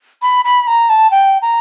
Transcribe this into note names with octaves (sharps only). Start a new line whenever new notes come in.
B5
B5
A#5
A5
G5
A#5